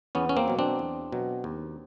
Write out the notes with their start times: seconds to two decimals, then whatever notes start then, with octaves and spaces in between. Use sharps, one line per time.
0.15 E2 B3 C#4
0.29 C#4
0.37 A#3 C4
0.48 B2 F#3
0.59 C4 D4
0.79 E2
1.12 B2 F#3
1.44 D#2